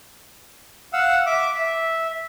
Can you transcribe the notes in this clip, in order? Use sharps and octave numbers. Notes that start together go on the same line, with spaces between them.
F5 F#5 E6
E5 D6
E5